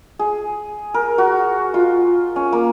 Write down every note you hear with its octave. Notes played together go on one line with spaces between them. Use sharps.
G#4
A#4
F#4
F4
C#4
A#3